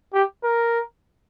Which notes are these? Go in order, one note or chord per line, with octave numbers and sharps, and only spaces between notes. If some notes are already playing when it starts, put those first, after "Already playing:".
G4
A#4